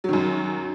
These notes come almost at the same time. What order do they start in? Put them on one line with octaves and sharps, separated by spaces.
F#3 D#3 F#2